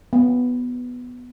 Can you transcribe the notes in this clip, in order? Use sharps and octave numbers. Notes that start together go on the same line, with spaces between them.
B3